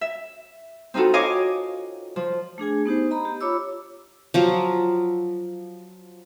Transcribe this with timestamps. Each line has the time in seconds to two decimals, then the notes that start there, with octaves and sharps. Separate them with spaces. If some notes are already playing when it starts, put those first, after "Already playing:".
0.01 E5
0.94 C4 D#4 F4 F#4 A4
1.13 C#5 D#5 F5 G#5 D6
2.16 F3
2.58 A3 D4 G#4 G#5
2.86 B3 D#4 G4 C5
3.11 D#5 A#5 B5
3.25 G4
3.41 F4 C#5 B5 D6 E6
4.34 F3 F#3 F4